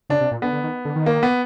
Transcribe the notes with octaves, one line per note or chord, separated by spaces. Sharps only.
C#3 D4
C3
A#2
D3 B3
D3
D#3
D3
D#3
A#3
B3